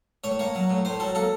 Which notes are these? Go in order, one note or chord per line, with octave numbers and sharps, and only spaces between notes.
A2 C#5
A#3 C#5
F#3
A2
A2 C5
F#3 A4
A#3 A4